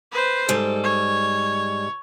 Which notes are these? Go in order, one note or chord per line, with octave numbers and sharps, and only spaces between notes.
B4 C5
G#2 G3 A4
C#5